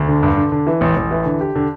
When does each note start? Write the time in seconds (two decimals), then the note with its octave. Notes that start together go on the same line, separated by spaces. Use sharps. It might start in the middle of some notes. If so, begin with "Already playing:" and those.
Already playing: D2
0.08 D3
0.23 G2
0.37 D3
0.52 D3
0.67 E3
0.81 A1
0.96 A1
1.11 E3
1.25 D3
1.41 G4
1.55 D3